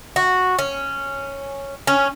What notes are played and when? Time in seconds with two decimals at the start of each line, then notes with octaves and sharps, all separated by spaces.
0.16 F#4
0.59 C#4
1.87 C#4